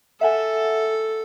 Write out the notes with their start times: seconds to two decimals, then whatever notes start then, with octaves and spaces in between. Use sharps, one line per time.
0.21 A4 E5 F#5 G#5